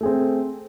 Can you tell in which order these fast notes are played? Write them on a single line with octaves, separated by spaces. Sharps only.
A3 G#4 C4